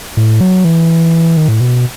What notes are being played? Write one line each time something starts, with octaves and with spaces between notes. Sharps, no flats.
A2
F#3
E3
D#3
A2
B2